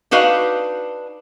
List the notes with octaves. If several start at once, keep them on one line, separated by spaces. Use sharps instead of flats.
D4 D#4 F#4 B4 F5